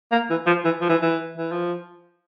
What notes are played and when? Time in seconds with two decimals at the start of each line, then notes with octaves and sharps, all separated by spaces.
0.12 A#3
0.30 E3
0.47 F3
0.65 E3
0.81 F3
0.89 E3
1.02 E3
1.38 E3
1.52 F3